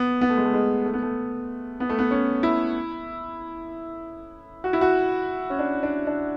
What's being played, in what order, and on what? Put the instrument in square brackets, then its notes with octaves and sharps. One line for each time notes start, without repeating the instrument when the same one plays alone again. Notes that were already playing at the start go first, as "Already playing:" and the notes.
Already playing: [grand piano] B3
B3
A3
G#3
A3
G#3
A3
B3
A3
B3
A3
B3
C#4
E4
F#4
E4
F#4
C#4
D4
D4
D4